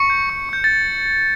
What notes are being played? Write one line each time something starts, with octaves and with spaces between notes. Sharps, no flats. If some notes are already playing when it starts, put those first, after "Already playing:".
Already playing: C#6 C#7
G6
C#6
C#6 G6
A6